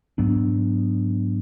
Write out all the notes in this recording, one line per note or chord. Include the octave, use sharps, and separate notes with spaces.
G#2 F#3 B3 D4